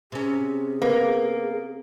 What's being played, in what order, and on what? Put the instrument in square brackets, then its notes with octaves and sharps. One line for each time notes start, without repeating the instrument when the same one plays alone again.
[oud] C3 C#4 [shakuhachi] G#4
[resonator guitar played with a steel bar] A#3 [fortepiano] B3